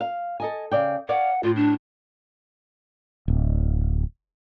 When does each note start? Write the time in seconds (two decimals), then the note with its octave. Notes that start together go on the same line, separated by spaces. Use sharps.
0.01 F5
0.40 A4 D#5 G#5
0.71 C#3 D5 G5
1.09 C#5 D5 F5 F#5
1.43 A2 F4
1.56 D4
3.28 D1